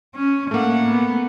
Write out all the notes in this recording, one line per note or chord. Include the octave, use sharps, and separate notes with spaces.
C#4
A2 A3 A#3 F#5
B3